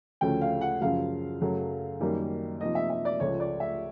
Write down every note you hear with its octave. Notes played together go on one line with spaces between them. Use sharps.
D2 C#3 F3 A3 C#4 G5
F5
F#5
F#2 C#3 F3 F5
F#2 C#3 F#3 A3
F#2 D#3 G3 A#3
C3 F3 A#3 D#4 D#5
E5
E5
D5
C#2 C#3 F3 A3 C#5
D5
E5